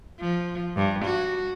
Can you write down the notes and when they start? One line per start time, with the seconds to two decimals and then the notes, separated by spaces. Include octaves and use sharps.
0.20 F3
0.77 G2
1.06 F#4